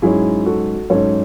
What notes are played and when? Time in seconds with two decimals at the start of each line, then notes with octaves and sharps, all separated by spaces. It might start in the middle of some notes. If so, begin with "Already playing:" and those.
0.02 G#2 F#3 C#4 E4 G#4
0.46 F#4 A4
0.90 G#2 F#3 C#4 A4 C#5